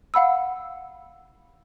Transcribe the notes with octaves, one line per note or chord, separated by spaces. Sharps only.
F5 F#5 B5 E6